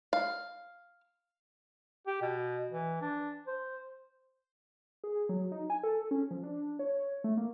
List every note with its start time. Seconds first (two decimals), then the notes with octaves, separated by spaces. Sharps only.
0.13 F5
2.07 G4
2.21 B2
2.71 E3
3.01 D4
3.47 C5
5.04 G#4
5.29 F#3
5.52 D#4
5.70 G#5
5.83 A4
6.11 C#4
6.31 F3
6.43 D4
6.79 C#5
7.24 A3
7.37 A#3